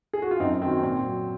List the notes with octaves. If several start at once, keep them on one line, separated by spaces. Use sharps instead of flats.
G#4
F#4
F4
F#2 C4 D#4
D#3 F#3 C4
A#2 C4
F#3